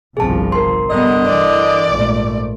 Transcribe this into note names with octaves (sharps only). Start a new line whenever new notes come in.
G1 C2 F3 G#4 A5
A#4 C6
G2 D3 B3 D#5
E3 D5
A#1 G#2 A3